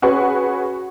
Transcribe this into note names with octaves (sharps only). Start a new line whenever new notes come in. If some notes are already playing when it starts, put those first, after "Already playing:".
C#4 F#4 G#4 B4 F#5 C#6